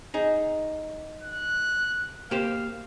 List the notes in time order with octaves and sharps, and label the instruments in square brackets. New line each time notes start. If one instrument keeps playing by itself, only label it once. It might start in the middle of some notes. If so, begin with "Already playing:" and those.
[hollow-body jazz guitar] D#4 G#4
[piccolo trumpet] F#6
[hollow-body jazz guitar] A#3 G4 C5 [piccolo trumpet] F5